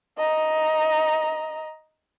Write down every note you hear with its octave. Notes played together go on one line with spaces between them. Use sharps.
D#5 A#5